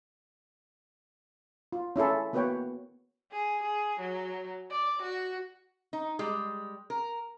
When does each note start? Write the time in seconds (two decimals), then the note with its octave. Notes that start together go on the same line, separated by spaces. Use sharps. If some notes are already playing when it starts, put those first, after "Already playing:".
1.72 F4
1.96 C#4 E4 G#4 A4
2.33 A#3 B3 F#4 B4 C#5 G5
3.32 G#4
3.63 G#4
4.00 F#3
4.71 D5
5.02 F#4
5.93 D#4
6.19 G3 G#3
6.90 A#4